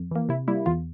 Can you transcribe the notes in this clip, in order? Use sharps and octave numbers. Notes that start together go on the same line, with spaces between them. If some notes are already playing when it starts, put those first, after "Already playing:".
Already playing: F2
E3 A#3
C3 E4
G3 A#3 E4
E2 F4